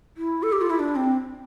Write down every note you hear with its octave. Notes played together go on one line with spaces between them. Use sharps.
E4
A4
G4
F4
E4
D4
C4